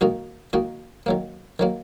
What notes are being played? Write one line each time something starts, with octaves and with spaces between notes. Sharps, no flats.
D#3 A#3 D#4 F#4
D#3 A#3 D#4 F#4
D#3 F#3 A#3
D#3 F#3 A#3